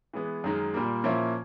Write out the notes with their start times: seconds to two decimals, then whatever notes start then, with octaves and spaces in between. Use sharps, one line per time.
0.13 E3 G#3 B3
0.44 F#2 D#3 G#3
0.74 A#2 G3 A#3
1.04 A#2 F3 A#3 C#4 E4